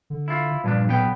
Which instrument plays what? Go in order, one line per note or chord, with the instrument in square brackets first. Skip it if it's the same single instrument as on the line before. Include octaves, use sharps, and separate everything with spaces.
[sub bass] D3
[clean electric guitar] E4 F4
[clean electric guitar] G2 F3 D4 [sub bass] A#2
[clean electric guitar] B1 B3 G5